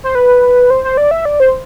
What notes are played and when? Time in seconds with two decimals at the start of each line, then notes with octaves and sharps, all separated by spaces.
0.04 C5
0.15 B4
0.70 C5
0.84 C5
0.97 D5
1.11 E5
1.25 D5
1.40 C5